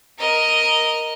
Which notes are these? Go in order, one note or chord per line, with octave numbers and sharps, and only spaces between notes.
A#4 D#5